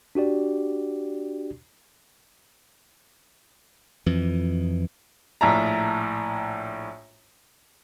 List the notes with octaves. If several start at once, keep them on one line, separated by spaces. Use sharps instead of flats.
D4 F#4 G4 D5
F2 E3
A#1 A2 E5 A5 A#5